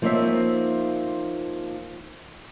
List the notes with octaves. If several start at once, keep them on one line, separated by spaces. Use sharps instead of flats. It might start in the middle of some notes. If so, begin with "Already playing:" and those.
F3 A#3 C4 D#4 C#5 E5